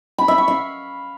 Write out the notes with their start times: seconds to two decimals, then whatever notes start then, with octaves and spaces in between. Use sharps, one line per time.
0.18 B5
0.28 E5
0.38 C#6
0.48 F5